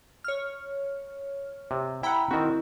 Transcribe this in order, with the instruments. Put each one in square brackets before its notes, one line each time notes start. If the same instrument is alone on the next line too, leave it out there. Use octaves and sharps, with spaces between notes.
[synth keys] C#5 F6
[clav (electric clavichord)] C3
[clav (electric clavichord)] E4 F#5 [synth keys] G5 A#5 B5
[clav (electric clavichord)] D#3 F#4 [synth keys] C4 E4